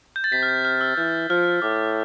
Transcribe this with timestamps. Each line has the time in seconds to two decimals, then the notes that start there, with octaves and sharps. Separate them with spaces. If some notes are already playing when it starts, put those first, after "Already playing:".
0.16 G6
0.24 A6
0.32 C3 B6
0.43 F6
0.48 G6
0.65 F6
0.81 E6
0.97 E3 G6
1.30 F3 F6
1.62 A2 D6